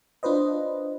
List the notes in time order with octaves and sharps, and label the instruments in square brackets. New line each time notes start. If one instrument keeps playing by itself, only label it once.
[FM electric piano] D4 F4 B4 C5 D#5